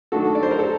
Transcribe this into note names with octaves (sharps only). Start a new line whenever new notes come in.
D#3 A3 D4 F#4 A4
D5
C5
A#4
A4